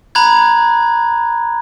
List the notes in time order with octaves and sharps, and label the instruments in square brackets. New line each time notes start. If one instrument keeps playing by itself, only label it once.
[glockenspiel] A#5 B5 F#6 G#6